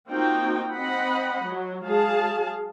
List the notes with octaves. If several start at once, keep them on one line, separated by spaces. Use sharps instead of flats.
A#3 C4 D#4 F4 F#4 G5
C4 D#5 F#5 B5
F#3
F#3 G#3 G#4 F5 A5